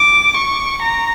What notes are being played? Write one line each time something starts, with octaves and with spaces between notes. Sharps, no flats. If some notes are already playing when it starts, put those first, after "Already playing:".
Already playing: D6
C#6
A#5